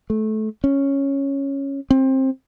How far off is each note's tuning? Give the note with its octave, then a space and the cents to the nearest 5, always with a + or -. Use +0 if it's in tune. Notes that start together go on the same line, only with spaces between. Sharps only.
A3 -20
C#4 -5
C4 +20